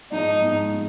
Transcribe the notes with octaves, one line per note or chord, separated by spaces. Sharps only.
G#2 F3 G#3 D#4
G#2 F3 G#3
G#3